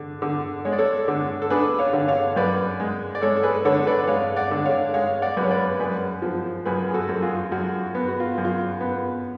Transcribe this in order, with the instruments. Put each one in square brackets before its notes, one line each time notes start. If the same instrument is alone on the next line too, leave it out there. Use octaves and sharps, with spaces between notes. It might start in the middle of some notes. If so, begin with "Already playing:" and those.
Already playing: [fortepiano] D3
D3
G#3 C#5
D5
A4 C#5
D3
A4
D4 G#4 B4
C#5 F5
D3
C#5 F5
F#2 B4 D5
G#3
D5
G#3 A4 C#5
A4
G#4 B4
D3 A4 C#5
C#5
B4 D5
G#3 C#5 F5
D5 F#5
D3
C#5 F5
G#3 C#5 F5
D5 F#5
F#2 B4
C#5
B4 D5
F#2 G#4 B4
F3
F#2 G#4 B4
G#4
F#4 A4
F#2
F4 G#4
F#2 F#4
B3
F#4
F4
F#2
F4
B3